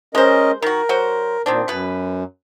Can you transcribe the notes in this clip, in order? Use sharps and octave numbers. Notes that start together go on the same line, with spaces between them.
G#3 C#4 A#4 C5 D#5
D#3 F#4 A#4
F#3 F#4 C5
A#2 D#3 C4 D4
F#2 B2 B4